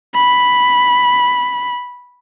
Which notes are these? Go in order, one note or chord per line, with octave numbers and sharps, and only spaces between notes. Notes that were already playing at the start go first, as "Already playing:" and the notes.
B5